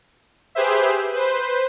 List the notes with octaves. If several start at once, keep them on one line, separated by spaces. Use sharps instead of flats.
G4 G#4 B4 C5 E5
B4 C5